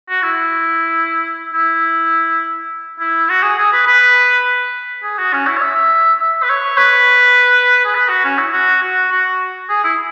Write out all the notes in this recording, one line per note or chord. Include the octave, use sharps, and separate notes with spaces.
F#4
E4
E4
E4
F#4
G#4
G#4
B4
B4
G#4
F#4
C#4
E4
C#5
E5
E5
B4
C#5
B4
G#4
B4
F#4
C#4
E4
F#4
F#4
F#4
G#4
E4